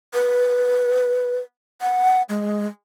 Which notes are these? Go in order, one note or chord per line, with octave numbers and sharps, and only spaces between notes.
B4
F#5
G#3